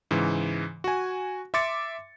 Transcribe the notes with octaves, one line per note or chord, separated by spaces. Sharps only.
G#2 C#3 E3
F#4 G#5
E5 C6 D6 A6 C#7